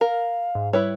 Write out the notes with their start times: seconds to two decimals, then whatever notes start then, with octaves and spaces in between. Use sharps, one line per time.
0.01 A#4 F5
0.55 G#2
0.73 G3 E4 B4 C#5